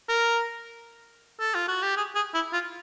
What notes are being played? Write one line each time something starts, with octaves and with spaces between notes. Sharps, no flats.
A#4
A4
F4
F#4
G4
G#4
G#4
E4
F4